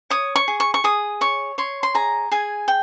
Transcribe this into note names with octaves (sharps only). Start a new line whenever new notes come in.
C#5 D#6
C#6
G#4
C#6
C#6
G#4 D#6
C#5 C#6
C#5 C6
C6
G#4 A#5
G#4 G#5
G5